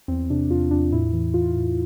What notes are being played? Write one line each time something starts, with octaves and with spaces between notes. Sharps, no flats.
E2 C4
C3 D4
E2 F4
E2 D4
A2 E4
E3
E3 F4
A2